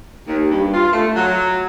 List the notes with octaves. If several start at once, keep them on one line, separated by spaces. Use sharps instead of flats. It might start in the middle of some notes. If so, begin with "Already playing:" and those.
D#2
G2
F4
A3
F#3